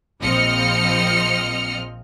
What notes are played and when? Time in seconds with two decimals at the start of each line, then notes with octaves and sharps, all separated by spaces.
0.21 A#1 F3 C4 D#5 F6 C#7